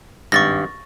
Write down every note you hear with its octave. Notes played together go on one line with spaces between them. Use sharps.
G#1 G2 C#6 A6 A#6